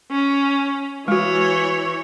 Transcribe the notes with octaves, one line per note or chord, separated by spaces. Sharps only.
C#4
E3 G#3 F#4 C#5